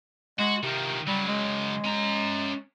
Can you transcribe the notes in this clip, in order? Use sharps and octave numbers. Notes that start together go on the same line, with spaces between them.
G#3 F#4
C3 D#3 F3
C#3 F#3 G3
G#3
C#4 A#5